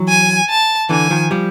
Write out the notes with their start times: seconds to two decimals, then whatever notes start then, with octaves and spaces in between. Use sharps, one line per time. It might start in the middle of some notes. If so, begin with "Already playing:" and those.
Already playing: E3 F#3
0.09 G#5
0.49 A5
0.89 D3 E3 G#5
1.10 D#3 F3
1.31 F3 G3